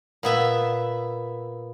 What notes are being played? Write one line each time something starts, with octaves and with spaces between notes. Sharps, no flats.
A#2 B3 E5